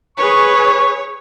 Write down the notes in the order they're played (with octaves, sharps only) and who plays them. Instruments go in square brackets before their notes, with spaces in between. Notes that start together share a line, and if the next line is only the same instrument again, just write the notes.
[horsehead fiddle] G#4 B4 [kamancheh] C#5 [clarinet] C#6